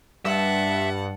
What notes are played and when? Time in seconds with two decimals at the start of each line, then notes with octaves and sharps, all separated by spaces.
0.25 G2 E5 F#5 A5